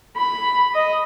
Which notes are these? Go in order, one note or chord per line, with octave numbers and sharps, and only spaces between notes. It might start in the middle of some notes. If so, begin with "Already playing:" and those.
B5
D#5